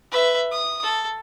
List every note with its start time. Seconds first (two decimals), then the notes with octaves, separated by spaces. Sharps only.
0.11 B4 E5
0.51 D#6
0.83 A4